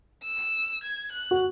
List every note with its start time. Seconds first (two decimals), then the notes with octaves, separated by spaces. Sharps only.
0.24 E6
0.83 G#6
1.12 F#6
1.31 F#4